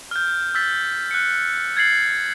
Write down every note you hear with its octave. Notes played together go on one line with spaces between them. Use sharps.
F6 G6
E6 G6 A6 B6
F#6 C#7
G#6 A6 C7 F#7